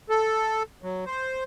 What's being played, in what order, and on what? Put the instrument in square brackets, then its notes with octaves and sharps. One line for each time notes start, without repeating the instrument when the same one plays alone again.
[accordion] A4
F#3
C5